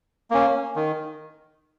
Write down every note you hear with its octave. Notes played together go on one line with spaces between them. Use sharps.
A#3 C#4
D#3